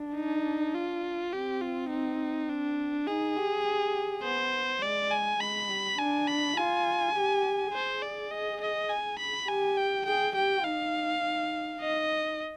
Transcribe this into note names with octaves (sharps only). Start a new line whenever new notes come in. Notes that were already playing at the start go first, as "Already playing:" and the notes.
Already playing: D4
D#4
F4
C4 G4
F4
D#4
D4
D#4 G#4
G4
G4
B3 C5
G#3 D5
G#5
G#3 B5
G3
D4 G#5
B5
F4 G#5
G4
G#4 C5
D5
D#5
D#5
G#5
B5
G4 G#5
G5
G#4 G5
G4 G5
D#4 F5
D#4
D#4 D#5